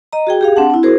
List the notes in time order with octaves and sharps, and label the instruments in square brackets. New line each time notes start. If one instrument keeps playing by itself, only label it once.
[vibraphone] D#5 A#5
F#4 G#4 G5
G4 G#4 F5
C4 D4 F#5 A5
C4 E4
F#4 G#4 A#4 C5